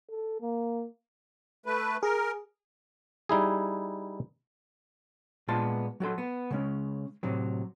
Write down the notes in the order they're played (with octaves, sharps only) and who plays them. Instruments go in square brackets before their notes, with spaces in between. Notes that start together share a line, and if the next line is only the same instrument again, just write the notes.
[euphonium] A4
A#3
[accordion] A3 B4
[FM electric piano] G#4 [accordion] A#4
[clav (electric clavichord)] G3 D#4 E4 G#4
[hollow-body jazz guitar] A#2 G#3 B3 F4 A5 C6
F#3 F#4 A4 C6
B3
C#3 G#3 C#4
A2 C3 F#3